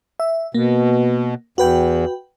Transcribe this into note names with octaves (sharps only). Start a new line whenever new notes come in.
E5
B2 A#3
E2 F#4 B4 G5